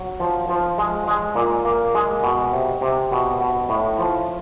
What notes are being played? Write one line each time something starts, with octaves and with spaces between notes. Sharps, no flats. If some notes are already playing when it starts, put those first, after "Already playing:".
Already playing: F#3
F3
F3
G#3
G#3
A#2
A#3
G#3
B2
C3
C3
B2
B2
A2
F3